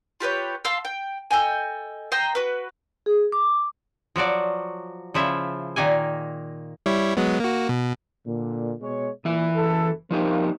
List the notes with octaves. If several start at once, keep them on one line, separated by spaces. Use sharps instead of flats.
F4 G4 B4 C#5
F5 A5 C6 E6
G5
A4 D#5 G5 G#5
C5 D#5 G5 A#5
F#4 B4
G#4
D6
F3 F#3 F#4 D5
C#3 F3 E4 E5
A#2 D#3 A#3 G#5
G3 E4 C#5
F#3 G#3 B3
A#3 F#4
B2
A#2 D3
B2 G#3 C#5
A#2 E3 E5
F#1 A4
F3 A#3 D#4 G4